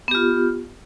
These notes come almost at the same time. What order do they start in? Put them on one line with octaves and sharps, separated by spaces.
B3 G4 F4